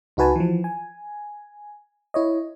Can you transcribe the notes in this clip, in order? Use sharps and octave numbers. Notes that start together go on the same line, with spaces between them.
C#2 D#4 F#4 B4 G#5 A5
E3 F3
G#5
E4 C#5 D#5